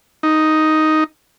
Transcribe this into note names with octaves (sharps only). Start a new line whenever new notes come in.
D#4